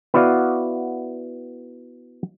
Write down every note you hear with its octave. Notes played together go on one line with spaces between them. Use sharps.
B3 E4 F#4 D5 F5